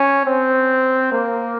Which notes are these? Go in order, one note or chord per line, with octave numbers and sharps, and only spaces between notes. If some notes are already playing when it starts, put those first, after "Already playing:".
Already playing: C#4
C4
A#3